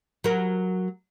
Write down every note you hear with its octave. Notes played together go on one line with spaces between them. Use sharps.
F#3 A#4